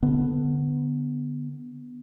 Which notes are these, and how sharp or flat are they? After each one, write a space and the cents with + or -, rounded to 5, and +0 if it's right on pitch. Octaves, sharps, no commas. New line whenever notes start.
D3 +0 B3 -5